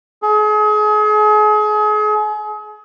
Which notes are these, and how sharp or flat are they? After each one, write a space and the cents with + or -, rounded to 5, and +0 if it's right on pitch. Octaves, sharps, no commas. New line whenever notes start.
G#4 +35